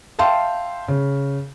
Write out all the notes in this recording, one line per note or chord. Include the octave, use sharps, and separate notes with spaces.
E5 F5 G5 A5 C6
C#3